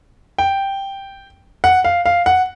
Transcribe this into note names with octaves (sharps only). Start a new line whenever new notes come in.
G5
F#5
F5
F5
F#5